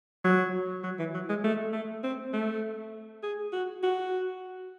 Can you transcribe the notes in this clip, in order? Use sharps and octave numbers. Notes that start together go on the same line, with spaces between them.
F#3
F#3
E3
F#3
G#3
A3
A3
C4
A3
G#4
F#4
F#4